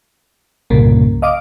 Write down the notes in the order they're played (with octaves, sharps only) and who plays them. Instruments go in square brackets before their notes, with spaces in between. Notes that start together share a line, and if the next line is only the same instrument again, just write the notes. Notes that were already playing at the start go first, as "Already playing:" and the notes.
[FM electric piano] C2 G2 A#2 C#3 A#3
D#5 F5 D6 D#6